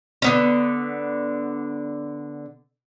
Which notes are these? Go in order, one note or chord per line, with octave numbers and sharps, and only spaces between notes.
D3 B3 C#4